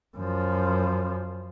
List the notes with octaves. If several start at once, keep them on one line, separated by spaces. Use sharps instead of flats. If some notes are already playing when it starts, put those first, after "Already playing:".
F#2 F3